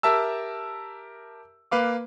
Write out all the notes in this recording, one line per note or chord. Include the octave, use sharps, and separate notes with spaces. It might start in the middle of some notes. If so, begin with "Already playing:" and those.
G4 A#4 E5 A5 E6
A#3 B4 F5 D6